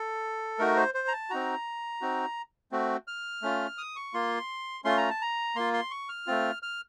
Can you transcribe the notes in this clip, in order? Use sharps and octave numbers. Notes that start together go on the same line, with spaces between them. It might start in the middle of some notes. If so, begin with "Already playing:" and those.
Already playing: A4
A3 D#4 F#4 A#4
C5
C5
A#5
A5
C4 D#4 F#4 A#5
C4 D#4 F#4
A3 C4 F#4
F6
A3 C#4 F4
D#6
C#6
A#3 F4 C6
A3 C#4 F4 C6
A#5
A5
A#5
A#3 F4 C6
C6
C#6
F6
A3 C4 F4
F6